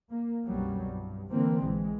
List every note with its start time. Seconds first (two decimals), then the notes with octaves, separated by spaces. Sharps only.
0.11 A#3
0.44 C2 F#2 B2 F#3 G3
0.85 G2
1.31 D3 E3 A#3 C4
1.60 A#1 E3 G#3